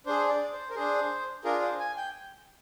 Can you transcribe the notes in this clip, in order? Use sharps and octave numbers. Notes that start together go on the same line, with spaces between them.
D4 G#4 C5
D5
C5
A#4
D4 G#4 C5
D4 F4 G#4 A#4
C5
G#5
G5